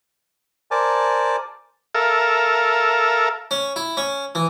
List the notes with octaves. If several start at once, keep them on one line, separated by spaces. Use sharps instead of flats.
A#4 C5 D5 G#5 A5 D6
A4 A#4 E5 F5
C#4
E4
C#4
E3